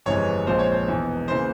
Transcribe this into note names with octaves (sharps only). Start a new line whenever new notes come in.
G1 F2 C3 E3 G#3 C#5
A#1 A#2 F3 G#3 C4 C5
C#5
C5
E1 E2 E3
C#3 E3 A#3 C5